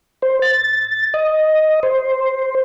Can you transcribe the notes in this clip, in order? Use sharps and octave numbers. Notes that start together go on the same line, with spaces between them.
C5
A6
D#5
C5